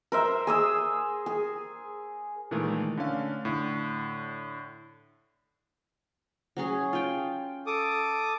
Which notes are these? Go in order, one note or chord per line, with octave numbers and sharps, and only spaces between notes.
A#4 C5 E5
G#4 D#6 E6
G#4
A#2 D#3 E3 G#3 A3
D3 A3 C#4 F5
A2 D3
F#3 C#4 G#4
F4 G5
A4 D6 D#6